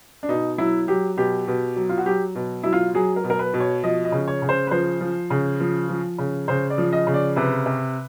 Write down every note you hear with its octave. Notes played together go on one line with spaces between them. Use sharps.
D4
B2 D#4
F#3 E4
F#3 G4
B2 G4
B2
F#3
F4
F#4
F#3 G4
B2
F#3 E4
F4
F#3 G#4
A#4
B2
A#4
B4
B2
C#5
F3 D#5
D#5
C#3
C#5
C#3
C5
B4
F3 C5
F3
C#3
F3
F3
C#3
C#3 C5
D5
F3
D#5
C#3
D5
C3 B4
C3